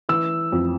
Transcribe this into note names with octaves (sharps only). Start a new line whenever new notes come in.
E3 E6
F2